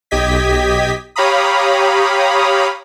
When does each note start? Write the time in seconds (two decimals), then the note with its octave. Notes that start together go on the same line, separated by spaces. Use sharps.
0.11 B1 G4 D#5 G#6 B6
1.16 G4 C#5 F5 A#5 B5 D#6